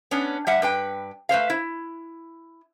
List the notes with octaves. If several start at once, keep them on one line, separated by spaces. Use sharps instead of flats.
B3 C#4 D4
G3 E5 F#5
G2 B4 G5
A3 B4 C5 F5
E4